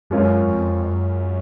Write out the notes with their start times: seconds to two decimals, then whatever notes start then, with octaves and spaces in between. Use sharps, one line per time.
0.10 F#2 G#3 C#4 F4 A#4 C#5
0.47 F2
0.83 F#2